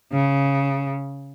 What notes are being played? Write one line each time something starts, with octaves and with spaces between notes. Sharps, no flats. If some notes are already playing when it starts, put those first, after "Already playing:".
C#3